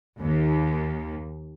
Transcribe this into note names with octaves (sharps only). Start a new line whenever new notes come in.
D#2